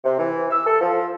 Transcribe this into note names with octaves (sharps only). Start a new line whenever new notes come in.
C3
E3
E6
A4
F3